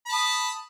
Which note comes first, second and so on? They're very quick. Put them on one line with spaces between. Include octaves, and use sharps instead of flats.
B5 A5 D#6